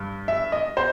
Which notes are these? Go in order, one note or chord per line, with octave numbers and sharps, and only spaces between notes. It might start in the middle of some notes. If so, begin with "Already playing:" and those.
Already playing: G2
E5
D#5
C5